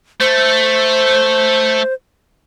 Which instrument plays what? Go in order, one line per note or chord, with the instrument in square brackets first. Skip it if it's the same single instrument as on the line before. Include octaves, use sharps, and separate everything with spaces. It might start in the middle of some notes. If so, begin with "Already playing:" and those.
[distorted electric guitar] A3 [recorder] C5